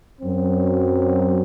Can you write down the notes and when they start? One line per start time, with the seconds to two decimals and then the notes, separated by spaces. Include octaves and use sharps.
0.21 F#2 F#3 C4